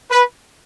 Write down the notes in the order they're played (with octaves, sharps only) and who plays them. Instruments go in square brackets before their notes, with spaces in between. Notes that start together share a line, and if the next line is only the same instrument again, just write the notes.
[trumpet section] B4